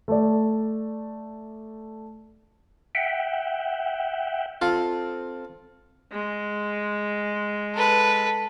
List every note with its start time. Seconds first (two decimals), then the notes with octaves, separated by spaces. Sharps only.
0.08 A3 D5
2.95 E5 F#5 G5
4.62 C4 F4 A4
6.12 G#3
7.75 A4 B4